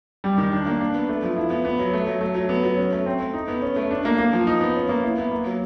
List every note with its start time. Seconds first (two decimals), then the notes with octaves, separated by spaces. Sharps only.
0.24 G3
0.38 D#3
0.52 D4
0.66 A#3
0.80 D4
0.94 B3
1.09 A3
1.23 F3
1.36 E4
1.50 B3
1.65 B3
1.79 F#3
1.94 A3
2.07 F#3
2.21 A3
2.35 F#3
2.49 B3
2.64 F#3
2.77 C#4
2.92 A3
3.06 C4
3.19 A3
3.34 D#4
3.48 B3
3.62 C#4
3.76 A3
3.91 D4
4.05 A#3
4.18 A#3
4.33 F3
4.47 D#4
4.61 B3
4.75 C#4
4.89 A#3
5.04 E4
5.18 B3
5.31 A#3
5.46 F#3